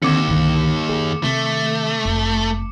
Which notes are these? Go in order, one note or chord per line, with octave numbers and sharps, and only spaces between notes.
D#2 D3 D#3 C4 D6 C#7
C2 G2 D3 D#3
F#2 G#4
C3 D#3 A3
F1